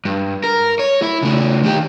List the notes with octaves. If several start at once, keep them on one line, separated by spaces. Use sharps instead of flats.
G2
A#4
C#5
E4
C#3 A3
D#3 G4